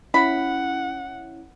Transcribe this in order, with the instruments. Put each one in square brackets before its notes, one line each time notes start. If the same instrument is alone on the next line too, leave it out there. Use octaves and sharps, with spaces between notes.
[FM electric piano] C#4 E4 [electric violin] F#5 [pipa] B5